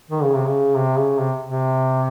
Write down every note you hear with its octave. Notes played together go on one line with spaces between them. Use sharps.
D#3
C#3
C3
C#3
C3
C#3
C3
C3